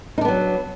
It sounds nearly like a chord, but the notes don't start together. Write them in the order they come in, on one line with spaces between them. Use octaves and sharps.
D#4 D4 B3 F#3